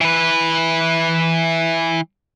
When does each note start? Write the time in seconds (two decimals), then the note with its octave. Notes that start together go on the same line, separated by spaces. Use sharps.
0.01 E3 B4